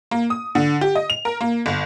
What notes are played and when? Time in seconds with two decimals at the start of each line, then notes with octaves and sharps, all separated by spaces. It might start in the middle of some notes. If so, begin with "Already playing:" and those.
0.11 A#3
0.30 D#6
0.55 D3
0.81 G4
0.95 D#5
1.10 F7
1.25 A#4
1.41 A#3
1.66 G1